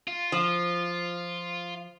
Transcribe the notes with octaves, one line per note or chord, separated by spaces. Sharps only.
F4
F3